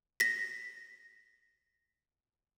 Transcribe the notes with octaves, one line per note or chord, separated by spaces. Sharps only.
A#6 B6